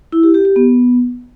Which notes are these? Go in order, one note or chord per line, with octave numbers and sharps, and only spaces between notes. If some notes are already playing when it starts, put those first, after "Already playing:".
E4
G4
G4
G4
B3